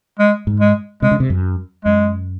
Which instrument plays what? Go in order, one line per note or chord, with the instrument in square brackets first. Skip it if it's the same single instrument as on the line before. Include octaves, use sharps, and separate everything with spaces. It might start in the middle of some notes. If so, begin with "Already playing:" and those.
[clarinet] G#3
[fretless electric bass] G#2
[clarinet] G#3
[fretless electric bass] C3 [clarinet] G#3
[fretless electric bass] C#3
C3
F#2
[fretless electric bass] F#2 [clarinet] G#3